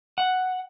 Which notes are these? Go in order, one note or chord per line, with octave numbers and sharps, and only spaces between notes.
F#5